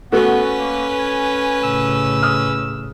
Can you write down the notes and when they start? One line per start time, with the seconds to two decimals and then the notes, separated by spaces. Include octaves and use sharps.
0.12 A3 B3 C#4 F#4 B4
0.57 A#3
0.99 G#5
1.63 A2 C#3 E6
2.23 D#6 F6